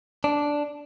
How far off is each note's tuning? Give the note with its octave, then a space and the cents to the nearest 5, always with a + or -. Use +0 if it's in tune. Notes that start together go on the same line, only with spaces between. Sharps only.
D4 -5